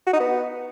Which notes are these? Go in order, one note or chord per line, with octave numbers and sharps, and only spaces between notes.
F#4
D#4
B3